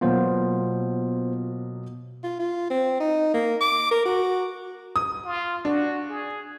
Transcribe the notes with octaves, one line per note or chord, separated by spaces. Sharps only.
B2 F#3 A#3 B3 F4 C5
F4
F4
C4
D#4
A#3
D6
A#4
F#4
D#6
F4
D4 F#4
G#4